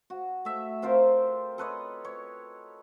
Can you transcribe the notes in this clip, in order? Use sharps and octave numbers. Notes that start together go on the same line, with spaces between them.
F#4
A3 E5
C4 F4 A#4 C5
A4 B4 C#5 D#5
C#5